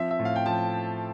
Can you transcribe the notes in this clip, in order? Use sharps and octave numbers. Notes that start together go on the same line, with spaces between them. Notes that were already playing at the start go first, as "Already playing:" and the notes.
Already playing: F3 C4 E5
E5
A2
F5
G5
F3 A5